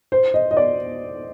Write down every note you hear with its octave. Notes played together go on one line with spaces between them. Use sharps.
C5
D#5
D#5
D5